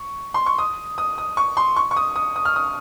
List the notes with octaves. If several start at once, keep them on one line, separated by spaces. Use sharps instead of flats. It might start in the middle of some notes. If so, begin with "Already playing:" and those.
Already playing: C#6
C6
C#6
D#6
D#6
D#6
C#6
C6
C#6
C#6
D#6
D#6
D#6
F6
D#6